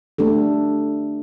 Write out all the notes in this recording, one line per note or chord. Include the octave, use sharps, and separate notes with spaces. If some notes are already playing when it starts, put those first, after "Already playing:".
A3 D4 G4 A4